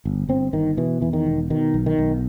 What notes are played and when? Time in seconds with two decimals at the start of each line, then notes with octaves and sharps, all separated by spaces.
0.05 G1
0.29 G1 C4
0.53 G1 D#3
0.77 B2 E3
1.01 E2 E3
1.13 D#3
1.26 E1
1.50 B2 D#3
1.74 B1
1.86 D#3
1.98 B1